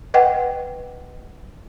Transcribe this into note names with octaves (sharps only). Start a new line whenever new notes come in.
B4 D#5 F#5 G5